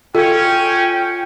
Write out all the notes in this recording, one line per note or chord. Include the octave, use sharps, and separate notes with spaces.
C#4 F4 A4 G5